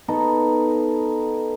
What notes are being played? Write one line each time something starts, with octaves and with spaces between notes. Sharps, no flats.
B3 D#4 A4